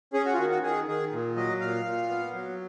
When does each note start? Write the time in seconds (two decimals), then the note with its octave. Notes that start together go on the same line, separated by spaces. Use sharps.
0.13 C#4 G#4
0.26 F#4
0.33 F4
0.38 D#3 F#4
0.50 F#4
0.63 D#3 G#4
0.87 D#3 G#4
1.12 A#2
1.36 F#3 D#5
1.61 A#2 F5
1.85 A#2
2.10 B3
2.34 F#3